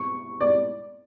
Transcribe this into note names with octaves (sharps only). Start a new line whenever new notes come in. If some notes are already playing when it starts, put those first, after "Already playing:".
Already playing: C#6
D5